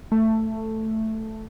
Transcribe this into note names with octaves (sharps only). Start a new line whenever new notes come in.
A3